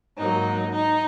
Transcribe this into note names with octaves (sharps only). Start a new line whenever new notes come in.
G#2 F#3 A#3 D#4
D#4